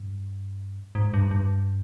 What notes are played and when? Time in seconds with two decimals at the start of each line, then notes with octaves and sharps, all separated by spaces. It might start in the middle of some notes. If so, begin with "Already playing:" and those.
Already playing: G2
0.95 G#2
1.14 G2
1.31 G2